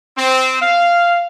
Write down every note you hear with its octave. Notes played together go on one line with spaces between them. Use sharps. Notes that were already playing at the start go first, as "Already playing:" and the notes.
C4
F5